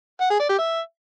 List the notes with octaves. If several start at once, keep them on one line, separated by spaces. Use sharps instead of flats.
F#5
G#4
D5
G4
E5